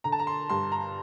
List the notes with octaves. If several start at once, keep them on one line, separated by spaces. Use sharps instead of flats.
D3 A#5
A5
A#5
C6
G2 C6
A#5